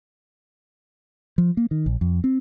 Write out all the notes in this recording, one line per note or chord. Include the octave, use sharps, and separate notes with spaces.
F3
A#3
D#3
A#1
F2
C4